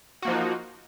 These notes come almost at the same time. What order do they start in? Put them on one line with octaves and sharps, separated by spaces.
F#4 A#3 F3 D#4